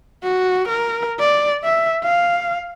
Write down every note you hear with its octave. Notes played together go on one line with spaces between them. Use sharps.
F#4
A#4
D5
E5
F5